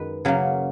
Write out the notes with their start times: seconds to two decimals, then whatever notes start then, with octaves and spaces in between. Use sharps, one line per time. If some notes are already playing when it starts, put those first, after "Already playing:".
Already playing: F#2 D#3 G#3 B4
0.25 C#3 F#3 A#3